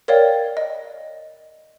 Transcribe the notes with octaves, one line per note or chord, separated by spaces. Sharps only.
A#4 C#5 D5 F5 G5
D#5